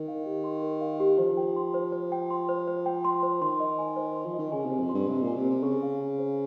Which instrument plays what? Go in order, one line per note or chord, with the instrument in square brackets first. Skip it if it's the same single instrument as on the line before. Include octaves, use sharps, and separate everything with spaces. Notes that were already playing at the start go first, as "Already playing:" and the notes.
Already playing: [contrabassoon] D#3 [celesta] A#4
[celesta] F5
G4
C6
A#4
F5
G4
[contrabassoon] F3 [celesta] C5
[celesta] G5
C6
C5
C5
G5
C6
C5
C5
G5
C6
C5
[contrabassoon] D#3 [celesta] C6
[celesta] D#5
G#5
C5
C6
[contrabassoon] F3
[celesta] D#5
[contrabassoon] D#3
[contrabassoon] C#3 [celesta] G#5
[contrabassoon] C3 [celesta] C5
[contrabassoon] F2
[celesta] C6
[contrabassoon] G2
[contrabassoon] C3 [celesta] D#5
[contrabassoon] A#2
[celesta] G#5
[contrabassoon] C3
[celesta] C5
[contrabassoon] C3
[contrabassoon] C#3 [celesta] C#6
[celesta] F5
G#5
C5